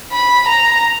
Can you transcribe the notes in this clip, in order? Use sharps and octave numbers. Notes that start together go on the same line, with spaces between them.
B5
A#5